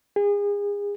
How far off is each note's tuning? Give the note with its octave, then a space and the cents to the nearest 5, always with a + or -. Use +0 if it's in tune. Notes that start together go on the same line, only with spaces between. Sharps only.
G#4 -35